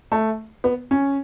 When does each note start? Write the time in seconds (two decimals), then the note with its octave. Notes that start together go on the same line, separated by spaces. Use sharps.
0.12 A3
0.64 B3
0.91 C#4